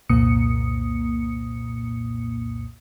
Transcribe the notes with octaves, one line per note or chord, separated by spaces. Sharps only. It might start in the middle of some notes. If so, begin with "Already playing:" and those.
C2 F2 A#2 A#3 D#6 C#7